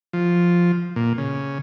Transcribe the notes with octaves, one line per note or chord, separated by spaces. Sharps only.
F3
A#2
C#3